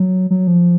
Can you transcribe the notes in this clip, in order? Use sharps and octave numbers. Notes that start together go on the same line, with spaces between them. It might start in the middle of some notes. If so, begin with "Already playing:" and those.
Already playing: F#3
F#3
F3